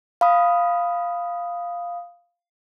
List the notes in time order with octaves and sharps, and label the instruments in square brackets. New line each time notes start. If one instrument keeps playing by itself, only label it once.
[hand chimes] F5 B5 D#6